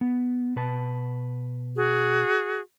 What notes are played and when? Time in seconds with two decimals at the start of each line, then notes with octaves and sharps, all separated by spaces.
0.01 B3
0.56 B2 B4 A5
1.75 F#4 G#4